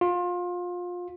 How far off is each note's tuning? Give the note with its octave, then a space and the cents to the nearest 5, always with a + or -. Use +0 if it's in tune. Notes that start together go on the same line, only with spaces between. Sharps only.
F4 +25